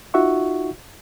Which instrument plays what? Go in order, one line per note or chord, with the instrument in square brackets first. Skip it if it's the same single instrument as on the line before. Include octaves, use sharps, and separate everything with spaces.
[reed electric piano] D#4 F4 F#4 E5 F#5 C#6